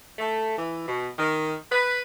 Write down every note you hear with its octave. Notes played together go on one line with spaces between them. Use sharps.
A3
E3
B2
D#3
B4